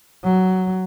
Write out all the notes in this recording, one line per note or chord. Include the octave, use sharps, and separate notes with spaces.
F#3